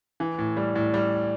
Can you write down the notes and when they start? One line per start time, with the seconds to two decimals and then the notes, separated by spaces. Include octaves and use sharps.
0.20 E3
0.38 A2
0.57 G3
0.75 A2
0.94 G3